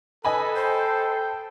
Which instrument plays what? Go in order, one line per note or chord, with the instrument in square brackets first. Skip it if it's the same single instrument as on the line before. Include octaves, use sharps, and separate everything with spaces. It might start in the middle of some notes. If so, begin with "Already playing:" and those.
[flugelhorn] A4 [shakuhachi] B4 [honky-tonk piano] D#5 G#5 B5
[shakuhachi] C5 [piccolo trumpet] G5